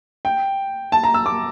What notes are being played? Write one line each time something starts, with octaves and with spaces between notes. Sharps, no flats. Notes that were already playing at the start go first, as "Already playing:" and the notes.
G5
A5
A#5
E6
D6